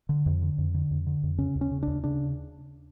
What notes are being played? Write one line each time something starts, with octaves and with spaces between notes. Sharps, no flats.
D3
F2
D3
F2
D3
F2
D3
F2
C#3 C#4
D#2
C#4
C#3
D#2 D4
C#3 D4